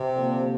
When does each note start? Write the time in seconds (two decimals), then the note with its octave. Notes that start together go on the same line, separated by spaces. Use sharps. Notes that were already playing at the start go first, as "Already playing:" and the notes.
Already playing: C3
0.15 D3 F3 A#3